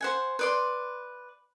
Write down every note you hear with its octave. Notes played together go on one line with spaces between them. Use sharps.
C5 F#5 G#5
B4 D5 C6